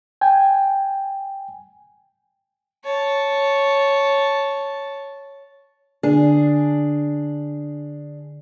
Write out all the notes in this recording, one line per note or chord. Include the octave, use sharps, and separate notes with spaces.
G5 G#5
C#5 A5
D3 D4 G#4